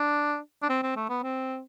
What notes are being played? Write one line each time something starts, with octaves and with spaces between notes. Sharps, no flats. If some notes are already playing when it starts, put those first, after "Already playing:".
Already playing: D4
D4
C4
C4
A3
B3
C4